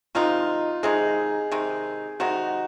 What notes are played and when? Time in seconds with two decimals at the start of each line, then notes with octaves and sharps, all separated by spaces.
0.15 C3 D#3 G#3 D#4 F4
0.83 C3 D#3 G#3 D#4 G#4
1.52 C3 D#3 G#3 D#4
2.20 C3 D#3 G#3 D#4 F#4